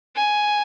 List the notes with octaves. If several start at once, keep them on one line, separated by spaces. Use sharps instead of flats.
G#5